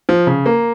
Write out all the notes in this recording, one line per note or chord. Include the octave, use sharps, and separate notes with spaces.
F3
C#3
A#3